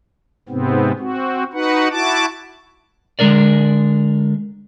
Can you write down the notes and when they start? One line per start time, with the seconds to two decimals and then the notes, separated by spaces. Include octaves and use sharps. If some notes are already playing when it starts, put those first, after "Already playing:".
0.49 G#2 C3 B3 C4
0.99 C4 F#4
1.53 D#4 F#4 B4 F#5
1.91 E4 F#4 A5 D6
3.19 D3 G#3 D4 A#4 D5